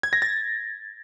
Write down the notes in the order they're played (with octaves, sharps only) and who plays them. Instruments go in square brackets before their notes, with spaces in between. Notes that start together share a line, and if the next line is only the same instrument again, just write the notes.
[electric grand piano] G#6
A#6
A6